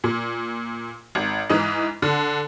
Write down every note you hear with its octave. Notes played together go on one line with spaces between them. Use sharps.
A#2
G#1
G#2 E3 D#4
D3